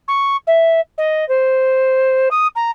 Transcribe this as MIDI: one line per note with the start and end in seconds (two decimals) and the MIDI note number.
0.08 0.36 85
0.47 0.80 76
0.98 1.27 75
1.28 2.29 72
2.31 2.47 87
2.56 2.71 82